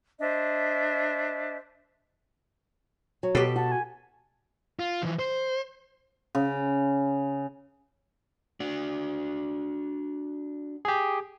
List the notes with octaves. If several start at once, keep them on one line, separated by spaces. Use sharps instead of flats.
D4 C5 D#5 E5
F#3
B2 G4 A4
F#4 A5
G#5
F4
E3 F3
C5
C#3
D4 F#4
G4 G#4